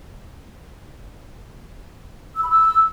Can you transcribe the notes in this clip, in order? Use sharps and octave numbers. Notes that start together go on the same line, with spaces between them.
E6
B5
E6